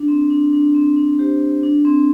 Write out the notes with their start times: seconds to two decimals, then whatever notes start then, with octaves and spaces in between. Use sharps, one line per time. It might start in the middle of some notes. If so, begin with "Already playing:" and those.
Already playing: D4
0.08 C4
0.30 D4
0.53 D4
0.75 C4
0.96 D4
1.19 G4 C5
1.63 D4
1.85 C4